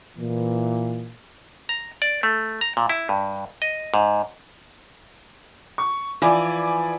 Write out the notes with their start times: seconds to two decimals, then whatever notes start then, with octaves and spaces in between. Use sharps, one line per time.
0.17 A#2 E3
1.69 A#5
2.02 D5
2.23 A3
2.61 A#5
2.77 A#2
2.90 E4
3.09 G2
3.62 D#5
3.94 G#2
5.78 C#6
6.22 E3 F3 D5 G#5